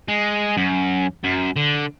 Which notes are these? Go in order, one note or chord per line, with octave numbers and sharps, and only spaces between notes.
G#3
F#2
F#2
D3